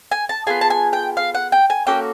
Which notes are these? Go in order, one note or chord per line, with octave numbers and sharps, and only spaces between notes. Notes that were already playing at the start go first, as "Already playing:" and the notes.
G#5
A5
B3 D4 F4 G#4 G#5
A5
G#5
G5
F5
F#5
G5
G#5
A#3 C#4 F#4 A4 G5